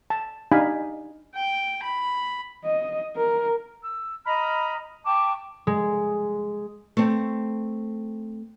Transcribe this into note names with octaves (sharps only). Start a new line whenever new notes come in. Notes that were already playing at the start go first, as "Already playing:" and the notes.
A5
D4 D#4 G4 F5 G#5 B5
G5
B5
D#5
A#4
E6
D#5 A#5 B5 F6
G5 A5 C#6 D6
G#3
A3 C4